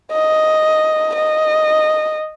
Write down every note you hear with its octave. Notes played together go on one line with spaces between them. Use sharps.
D#5
D#5